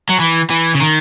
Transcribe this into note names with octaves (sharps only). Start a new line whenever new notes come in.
F#3
E3
E3
C#3
D#3